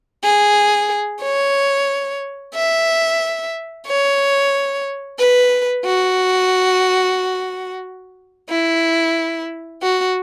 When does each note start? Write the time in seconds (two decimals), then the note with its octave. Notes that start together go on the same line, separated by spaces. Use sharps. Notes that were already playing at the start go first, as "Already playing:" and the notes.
0.24 G#4
1.22 C#5
2.55 E5
3.87 C#5
5.19 B4
5.86 F#4
8.49 E4
9.83 F#4